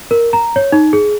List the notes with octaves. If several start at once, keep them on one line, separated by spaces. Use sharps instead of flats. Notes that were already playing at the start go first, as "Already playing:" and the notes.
A#4
A#5
C#5
D#4
G#4